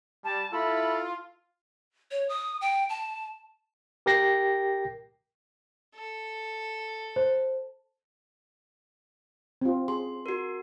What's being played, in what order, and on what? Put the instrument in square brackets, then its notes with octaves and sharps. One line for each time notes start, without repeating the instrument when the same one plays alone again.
[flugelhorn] G3 [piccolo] A5
[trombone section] E4 [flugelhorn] F4 [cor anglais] A4 [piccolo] B5
[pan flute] C#5
D#6
G5
A5
[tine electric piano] G4 A#4 G5 A#6 C7
[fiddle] A4
[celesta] C5
[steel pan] C4 F4
[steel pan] G#4 [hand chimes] C6
[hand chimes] F#4 A#4